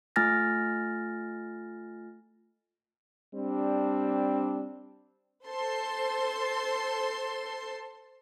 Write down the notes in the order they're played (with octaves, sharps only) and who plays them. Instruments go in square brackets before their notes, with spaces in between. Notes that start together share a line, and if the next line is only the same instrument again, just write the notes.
[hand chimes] A3 F4 G#5 F6 A6 A#6
[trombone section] G3 C4 D4
[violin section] A4 C5 A5 C6